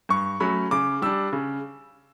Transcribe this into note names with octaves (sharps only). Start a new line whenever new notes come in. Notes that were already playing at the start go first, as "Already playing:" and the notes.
G2 C#6
F#3 A3 C#4 B5
C#3 D6
G3 D4 E6
C#3